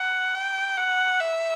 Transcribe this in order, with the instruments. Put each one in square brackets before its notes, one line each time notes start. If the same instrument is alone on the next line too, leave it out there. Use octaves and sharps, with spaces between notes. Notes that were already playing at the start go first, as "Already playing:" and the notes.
Already playing: [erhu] F#5
G5
F#5
E5